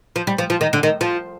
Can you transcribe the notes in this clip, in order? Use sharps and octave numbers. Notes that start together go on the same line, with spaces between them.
F3
G3
F3
F3
D#3
D3
D#3
F3